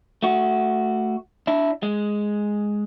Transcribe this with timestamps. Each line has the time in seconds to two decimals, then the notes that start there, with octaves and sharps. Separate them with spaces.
0.23 A3 F#4
1.47 D4 E4
1.83 G#3